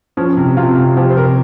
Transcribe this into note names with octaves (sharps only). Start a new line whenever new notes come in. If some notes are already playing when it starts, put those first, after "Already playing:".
F3 C#4
C3
C3 F4
C3
F3 G4
C5
C3 A#4